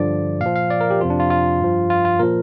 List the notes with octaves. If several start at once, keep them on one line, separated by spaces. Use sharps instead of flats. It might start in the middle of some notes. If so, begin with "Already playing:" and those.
Already playing: G2 D3 F3 D5
A#2 F5
F3
F5
D5
A#4
G4
F2 C3 F3 F4
D4
F4
F4
G2 F3
F4
F4
A#2 F3 A#4